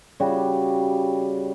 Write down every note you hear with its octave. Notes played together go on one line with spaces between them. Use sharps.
C#3 G3 F#4 G4